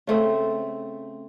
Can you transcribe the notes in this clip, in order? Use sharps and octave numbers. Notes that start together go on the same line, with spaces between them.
C#3 A3 C4